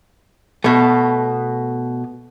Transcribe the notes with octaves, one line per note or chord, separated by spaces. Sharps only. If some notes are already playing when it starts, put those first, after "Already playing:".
B2 A3